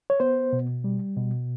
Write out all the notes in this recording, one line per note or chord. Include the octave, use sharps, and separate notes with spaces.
C#5
B3 C5
B2
G3
B2